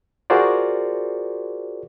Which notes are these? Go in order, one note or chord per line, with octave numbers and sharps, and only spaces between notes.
F4 F#4 G#4 A#4 C5 D5